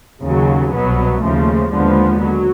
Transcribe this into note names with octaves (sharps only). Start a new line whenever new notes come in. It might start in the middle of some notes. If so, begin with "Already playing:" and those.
D#2 C#3 F#3
C2 B2 F#3 B3
D#2 C#3 F3 A3
D#2 D3 F3 G#3 B3
F#3